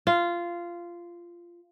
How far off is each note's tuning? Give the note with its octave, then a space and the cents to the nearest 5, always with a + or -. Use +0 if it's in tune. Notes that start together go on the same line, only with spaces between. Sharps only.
F4 -15